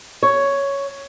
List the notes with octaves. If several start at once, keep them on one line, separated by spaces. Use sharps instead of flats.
C#5